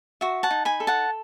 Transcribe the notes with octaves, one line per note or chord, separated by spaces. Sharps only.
F#4 E5
F#5 A5
D#4
G#5 B5
A4
F#5 A5